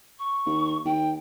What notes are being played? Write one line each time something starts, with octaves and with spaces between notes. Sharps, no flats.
C#6
D#2
D#2 G5